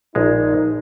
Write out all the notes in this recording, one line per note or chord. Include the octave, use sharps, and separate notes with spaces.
A#1 G#3 D#4